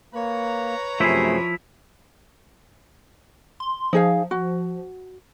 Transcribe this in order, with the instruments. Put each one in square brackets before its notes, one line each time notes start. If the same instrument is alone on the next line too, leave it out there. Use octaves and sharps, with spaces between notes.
[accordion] A#3 [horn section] B4 C#5 A#5
[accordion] F#2 C3 [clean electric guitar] F3 E4 [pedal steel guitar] A3 G#4
[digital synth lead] C6
[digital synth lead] F3 [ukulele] D#4 G#4 F5
[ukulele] F#4